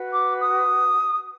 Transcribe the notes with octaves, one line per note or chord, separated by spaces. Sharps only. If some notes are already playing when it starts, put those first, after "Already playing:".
Already playing: F#4 B4
D6
D#6